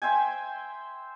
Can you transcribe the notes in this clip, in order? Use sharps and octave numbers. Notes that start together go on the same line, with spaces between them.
C5 E5 G5 G#5